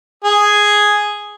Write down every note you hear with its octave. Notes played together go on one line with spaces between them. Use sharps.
G#4